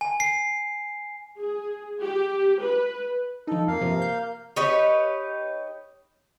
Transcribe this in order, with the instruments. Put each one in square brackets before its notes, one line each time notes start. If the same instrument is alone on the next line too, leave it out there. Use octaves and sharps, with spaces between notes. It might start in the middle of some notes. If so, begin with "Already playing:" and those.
[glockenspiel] G#5
C7
[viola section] G#4
G4
B4
[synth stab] F3 D#4 [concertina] A4
[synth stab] F2 [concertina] A#3 F5
[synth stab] G2 C3 F3
G6
[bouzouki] D#4 G4 B4 C#5